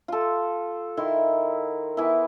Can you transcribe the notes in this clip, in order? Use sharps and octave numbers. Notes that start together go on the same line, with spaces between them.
F4 A4
D#3 E4 A#4 C6
E3 B3 E4